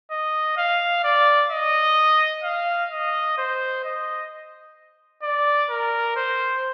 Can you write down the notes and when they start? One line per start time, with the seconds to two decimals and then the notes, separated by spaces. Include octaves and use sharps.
0.11 D#5
0.57 F5
1.04 D5
1.51 D#5
2.44 F5
2.91 D#5
3.38 C5
3.84 D#5
5.23 D5
5.70 A#4
6.16 C5